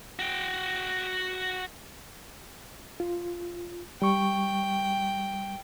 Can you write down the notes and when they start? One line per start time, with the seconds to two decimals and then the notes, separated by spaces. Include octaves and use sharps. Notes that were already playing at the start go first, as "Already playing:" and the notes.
0.19 F#4 G5
3.00 F4
4.02 G3 G5 C#6